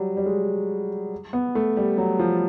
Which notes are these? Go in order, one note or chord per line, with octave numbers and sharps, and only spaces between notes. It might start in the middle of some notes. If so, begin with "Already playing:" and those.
Already playing: F#3 G3
G3
G#3
B3
A3
G3
F#3
F3